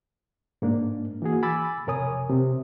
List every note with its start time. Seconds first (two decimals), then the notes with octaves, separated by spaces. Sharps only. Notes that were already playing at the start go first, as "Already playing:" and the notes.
0.62 G#2 A#3 D4
1.22 E3 A#3 F#4 G#4
1.43 G#5 B5 D6 E6 A6
1.87 F2 C3 A#4 C#5 G#5 D#6
2.30 C3